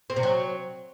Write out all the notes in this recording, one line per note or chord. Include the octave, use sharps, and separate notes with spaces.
C4
C3
F#3